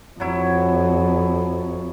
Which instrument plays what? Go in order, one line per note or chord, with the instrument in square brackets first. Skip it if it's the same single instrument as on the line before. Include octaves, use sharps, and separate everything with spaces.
[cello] F2 [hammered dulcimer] F#3 E4